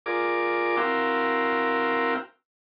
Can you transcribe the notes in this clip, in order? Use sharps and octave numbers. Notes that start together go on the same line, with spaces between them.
F4 G#4 A#4 D5 D6
C4 E4 F#4 A#4 F5 G5